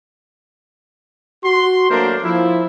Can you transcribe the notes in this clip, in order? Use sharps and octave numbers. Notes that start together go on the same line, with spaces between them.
F#4 C6
F#3 A3 A#3 D4 A#4 C5
F3 E4